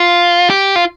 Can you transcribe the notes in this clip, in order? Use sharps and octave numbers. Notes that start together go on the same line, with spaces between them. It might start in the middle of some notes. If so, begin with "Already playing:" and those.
Already playing: F4
G4
F4